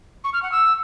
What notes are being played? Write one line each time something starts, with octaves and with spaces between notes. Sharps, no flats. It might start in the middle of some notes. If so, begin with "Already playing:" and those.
C#6
F6
F#5
E6